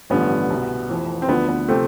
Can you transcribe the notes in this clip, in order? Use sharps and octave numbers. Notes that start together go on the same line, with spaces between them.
A1 G2 D3 F3 B3
C2 B2
F1 F2 E3
C4
D2 D3 F3 B3
B3
C3 F3 A3 C4